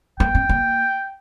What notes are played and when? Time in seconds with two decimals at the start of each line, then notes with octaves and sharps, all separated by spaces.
0.20 A#3 G5
0.35 C4
0.49 A#3